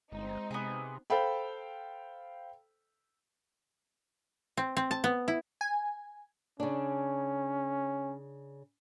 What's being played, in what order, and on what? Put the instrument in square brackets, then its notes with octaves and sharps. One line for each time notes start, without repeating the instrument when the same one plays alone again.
[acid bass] G1 [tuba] G#3 [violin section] C4 D#4
[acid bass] C3 [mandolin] B3 G#4
[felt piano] A4 C5 F5 G5 B5
[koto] C4
C4
A5
B3
E4
[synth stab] G#5
[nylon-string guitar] C#3 D4 [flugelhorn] C#4